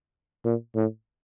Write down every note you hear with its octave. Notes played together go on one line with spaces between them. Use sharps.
A#2
A2